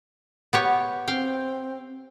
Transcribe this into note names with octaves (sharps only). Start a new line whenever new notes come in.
B3 G4 C#5
C4 F5 G5